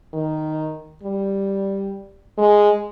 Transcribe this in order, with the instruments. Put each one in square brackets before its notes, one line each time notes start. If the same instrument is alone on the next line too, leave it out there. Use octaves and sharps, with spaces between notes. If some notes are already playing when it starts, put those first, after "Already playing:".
[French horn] D#3
G3
G#3